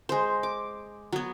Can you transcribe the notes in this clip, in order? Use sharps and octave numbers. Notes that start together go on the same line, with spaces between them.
G#3 C5
D6
F#3 B3